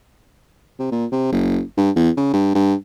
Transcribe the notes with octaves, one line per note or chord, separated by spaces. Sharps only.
C3
A#2
C3
F#1
G2
E2
C#3
G2
G2